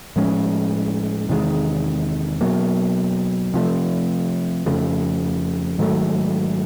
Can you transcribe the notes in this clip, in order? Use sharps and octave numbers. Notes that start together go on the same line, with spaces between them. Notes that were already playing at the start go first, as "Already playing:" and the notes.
A2 F3 G#3 C#4
E2 C3 D#3 G#3
B2 F#3 A#3
C3 F3 A3
F2 C#3 F3 A3
G#2 D#3 F#3 A3